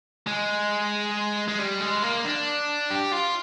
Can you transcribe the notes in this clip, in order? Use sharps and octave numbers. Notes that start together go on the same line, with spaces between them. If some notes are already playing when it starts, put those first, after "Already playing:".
G#3
G#3
G3
G#3
A#3
D4
G4
F4